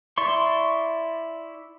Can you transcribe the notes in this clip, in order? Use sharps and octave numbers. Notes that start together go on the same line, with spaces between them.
E4 D5 C6 C#6